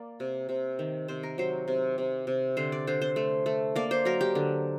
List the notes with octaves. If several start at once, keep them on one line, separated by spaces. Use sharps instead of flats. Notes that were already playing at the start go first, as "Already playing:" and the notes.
Already playing: A#3 D5
C3
C3
D#3
C3 C5
A#4
F#3 C5
C3
C3
C3
D3 C5
D5
D3 C5
C5
A3
A3
A#3 D5
C5
F#3 A#4
G4
D3